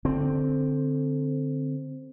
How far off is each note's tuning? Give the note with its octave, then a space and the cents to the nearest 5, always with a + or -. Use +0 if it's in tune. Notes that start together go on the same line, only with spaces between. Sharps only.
D3 +0 C4 +0